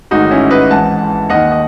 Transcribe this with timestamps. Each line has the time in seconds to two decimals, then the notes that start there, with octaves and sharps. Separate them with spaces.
0.11 A1 G#2 D#3 D#4 F#4
0.31 C#4 E4
0.51 B4 D#5
0.71 G#1 G#2 E3 F#5 A5
1.29 D#2 D#3 D#5 F#5
1.52 D#5